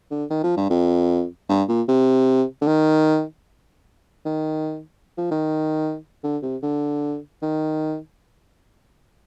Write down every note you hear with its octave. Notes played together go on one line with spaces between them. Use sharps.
D3
D#3
F3
G2
F2
G2
A#2
C3
D3
D#3
D#3
F3
D#3
D3
C3
D3
D#3